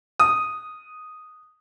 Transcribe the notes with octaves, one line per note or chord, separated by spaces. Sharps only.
D#6